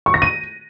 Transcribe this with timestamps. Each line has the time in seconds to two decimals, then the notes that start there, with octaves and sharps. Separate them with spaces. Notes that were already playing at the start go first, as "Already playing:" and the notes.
0.06 C#6
0.14 A#6
0.22 D#7